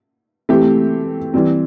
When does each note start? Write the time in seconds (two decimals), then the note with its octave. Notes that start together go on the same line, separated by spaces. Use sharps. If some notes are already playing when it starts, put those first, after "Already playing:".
0.49 E3 A3 C4 G4
1.34 E3 G3 C4